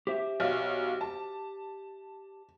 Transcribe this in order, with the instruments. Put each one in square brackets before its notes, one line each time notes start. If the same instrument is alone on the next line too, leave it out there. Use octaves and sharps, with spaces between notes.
[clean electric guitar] G4 C5 E5
[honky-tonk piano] B1 F5
A5